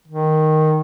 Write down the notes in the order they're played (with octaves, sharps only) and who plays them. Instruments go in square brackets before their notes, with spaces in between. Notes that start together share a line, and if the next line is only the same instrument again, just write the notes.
[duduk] D#3